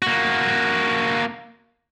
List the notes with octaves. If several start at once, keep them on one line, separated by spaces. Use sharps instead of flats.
A#3 F#4